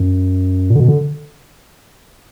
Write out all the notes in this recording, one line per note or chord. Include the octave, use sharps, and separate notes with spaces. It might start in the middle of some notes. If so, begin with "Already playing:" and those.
Already playing: F#2
A#2
D3
B2
D3